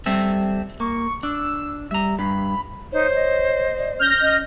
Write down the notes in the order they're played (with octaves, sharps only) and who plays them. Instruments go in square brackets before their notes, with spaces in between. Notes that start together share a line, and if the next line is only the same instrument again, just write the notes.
[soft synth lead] G3 [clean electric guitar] C4 A4 E5
[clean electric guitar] A#3 [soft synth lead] C#6
[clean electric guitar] D4 [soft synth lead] E6
[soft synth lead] G3 [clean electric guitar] E5 A#5
[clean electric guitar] G2 [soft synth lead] B5
[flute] D#4 [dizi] C5 [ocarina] C#5
[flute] D#5
[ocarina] D5
[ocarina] C#4 [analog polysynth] F6 G6 A#6
[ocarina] C#4 [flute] D#5